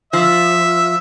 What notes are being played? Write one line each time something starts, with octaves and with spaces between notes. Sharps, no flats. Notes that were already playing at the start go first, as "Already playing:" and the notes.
F3 E5